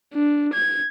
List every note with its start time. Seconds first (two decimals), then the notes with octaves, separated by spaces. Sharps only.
0.14 D4
0.54 G#6